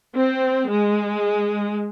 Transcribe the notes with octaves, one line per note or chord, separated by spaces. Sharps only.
C4
G#3